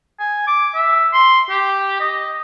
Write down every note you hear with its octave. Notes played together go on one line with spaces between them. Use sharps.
G#5
D6
E5
C6
G4
D#5